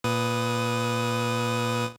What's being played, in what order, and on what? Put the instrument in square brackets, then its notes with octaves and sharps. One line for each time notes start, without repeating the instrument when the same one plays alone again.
[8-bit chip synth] A#2 B4 D#6